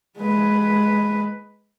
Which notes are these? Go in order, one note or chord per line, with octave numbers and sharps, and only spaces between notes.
G#3 B4